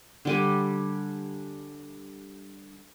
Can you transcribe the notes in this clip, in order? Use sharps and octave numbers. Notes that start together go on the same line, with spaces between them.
D3 G3 G#5